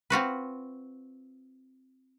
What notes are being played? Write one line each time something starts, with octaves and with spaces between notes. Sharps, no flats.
C4 F4 F#4 B4